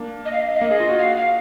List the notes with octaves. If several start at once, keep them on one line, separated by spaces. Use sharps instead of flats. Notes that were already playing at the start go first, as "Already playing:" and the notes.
Already playing: A#3 D4
D#5
F5
D#5
F5
D#5
A#3
G#4
F4
F#4
F5
F5